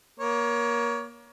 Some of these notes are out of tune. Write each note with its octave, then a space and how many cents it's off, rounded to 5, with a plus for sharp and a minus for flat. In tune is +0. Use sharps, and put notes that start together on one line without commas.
A#3 +25 C#5 +25